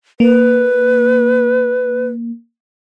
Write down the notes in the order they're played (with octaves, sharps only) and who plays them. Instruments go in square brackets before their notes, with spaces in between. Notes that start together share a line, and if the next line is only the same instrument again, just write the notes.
[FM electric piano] A#3 [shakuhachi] B4